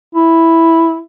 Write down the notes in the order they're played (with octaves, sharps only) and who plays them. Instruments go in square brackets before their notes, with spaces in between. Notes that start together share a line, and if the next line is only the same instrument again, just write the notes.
[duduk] E4